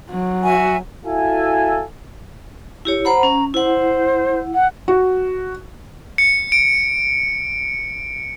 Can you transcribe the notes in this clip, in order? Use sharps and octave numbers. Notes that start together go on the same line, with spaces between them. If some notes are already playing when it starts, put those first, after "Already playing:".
F#3
F#4 E5 G#5
E4 F#4 A4 E5 F5 G#5
E4 G4 C#5
C5 F#5 A#5 B5
C#4
E4 C5 F#5
F#5
F#4
C#7
D7